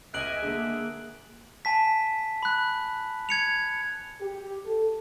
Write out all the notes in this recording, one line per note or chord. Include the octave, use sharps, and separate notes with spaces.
C#2 D#5 E5 G#5 F#6 D7 F#7
D3 G#3 A#3 G#4
G#5 A5 B6
B5 F#6
G#6 C#7 F7
G4
A4